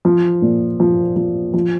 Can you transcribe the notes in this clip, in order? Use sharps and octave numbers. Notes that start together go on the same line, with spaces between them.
F3
A#2
F3
F3
F3